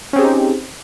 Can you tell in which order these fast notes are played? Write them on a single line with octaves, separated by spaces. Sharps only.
C#4 C4 G#4 G4 D#4